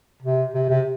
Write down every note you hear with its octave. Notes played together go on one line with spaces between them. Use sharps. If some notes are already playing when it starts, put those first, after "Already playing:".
C3
C3
C3